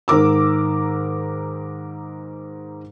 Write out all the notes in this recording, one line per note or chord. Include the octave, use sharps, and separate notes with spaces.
G#2 D#3 A#4 D6 E6